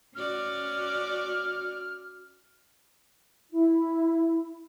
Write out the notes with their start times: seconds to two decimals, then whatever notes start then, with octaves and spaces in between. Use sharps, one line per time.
0.15 C#4 F#4 D5 F6
3.51 E4